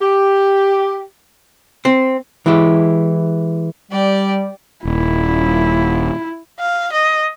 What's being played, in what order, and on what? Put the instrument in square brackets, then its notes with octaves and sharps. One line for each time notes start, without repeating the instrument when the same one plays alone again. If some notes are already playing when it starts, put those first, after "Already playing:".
[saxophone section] G4
[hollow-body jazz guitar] C4
E3 G#3 E4 G4
[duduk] G3 [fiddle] G4 D5
[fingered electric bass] D#1 [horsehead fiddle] E4
[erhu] F5
D#5